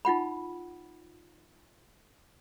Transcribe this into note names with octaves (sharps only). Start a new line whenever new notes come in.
D#4 F4 F#5 B5